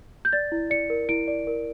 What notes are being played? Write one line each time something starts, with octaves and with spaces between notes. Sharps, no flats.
G6
D5 A6
E4
D5 C#7
A#4
E4 D7
D5
A#4